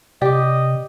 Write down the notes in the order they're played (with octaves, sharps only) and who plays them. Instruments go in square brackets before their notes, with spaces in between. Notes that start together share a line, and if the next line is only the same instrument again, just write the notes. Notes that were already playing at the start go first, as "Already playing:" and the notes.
[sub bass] C3 [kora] G4 [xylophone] D5 D6 [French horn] D#5